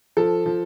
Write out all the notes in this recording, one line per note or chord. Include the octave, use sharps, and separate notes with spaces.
F3 A4
F3